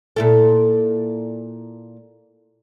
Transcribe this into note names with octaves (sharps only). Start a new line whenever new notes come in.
A#2 E4 A4